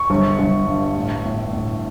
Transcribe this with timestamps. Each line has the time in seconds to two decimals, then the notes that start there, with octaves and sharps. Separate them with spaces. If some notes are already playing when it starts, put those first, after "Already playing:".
Already playing: C#6
0.10 G1
0.39 G1
0.67 G2
0.96 A2
1.25 A2
1.53 A2